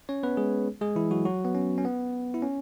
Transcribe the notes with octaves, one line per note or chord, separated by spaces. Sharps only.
C#4 C#5
B3 B4
G#3 G#4
G#3 G#4
E3 E4
F#3 F#4
F#3 F#4
B3
C#4
C#4
B3
E4
C#4